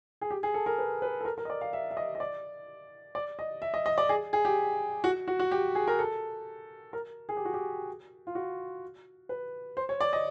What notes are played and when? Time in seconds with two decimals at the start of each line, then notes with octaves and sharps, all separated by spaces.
0.21 G#4
0.31 G4
0.43 G#4
0.54 A4
0.66 A#4
0.78 B4
1.02 B4
1.21 A4
1.25 A#4
1.38 A#4
1.45 D#5
1.50 D5
1.61 F5
1.73 E5
1.91 E5
1.97 D#5
2.15 D#5
2.20 D5
3.15 D5
3.39 D#5
3.62 E5
3.74 D#5
3.86 D#5
3.98 D5
4.09 G#4
4.33 G#4
4.45 G4
5.04 F#4
5.28 F#4
5.40 F#4
5.51 G4
5.75 G#4
5.88 A#4
5.99 A4
6.93 A#4
7.29 G#4
7.37 G4
7.45 F#4
7.54 G4
8.27 F4
8.35 F#4
9.29 B4
9.77 C5
9.89 C#5
10.01 D5
10.13 D#5